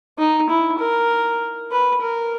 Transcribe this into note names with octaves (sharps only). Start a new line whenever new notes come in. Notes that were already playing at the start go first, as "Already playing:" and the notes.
D#4
E4
A#4
B4
A#4